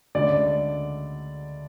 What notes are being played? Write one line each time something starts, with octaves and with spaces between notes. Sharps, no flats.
D2 D3 G#3 C#4 D5